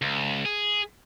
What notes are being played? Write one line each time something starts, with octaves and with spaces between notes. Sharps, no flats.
C#2
G#4